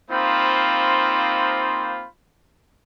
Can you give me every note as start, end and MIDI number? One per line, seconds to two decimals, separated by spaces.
0.10 2.05 58
0.10 2.05 60
0.10 2.05 63
0.10 2.05 65
0.10 2.05 72
0.10 2.05 83